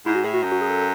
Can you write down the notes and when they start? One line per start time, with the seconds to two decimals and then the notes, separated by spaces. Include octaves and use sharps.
0.06 G#2 E4
0.15 F#4
0.24 A2 G#4
0.34 F#4
0.43 F#2
0.52 F#4
0.61 G#4
0.70 A4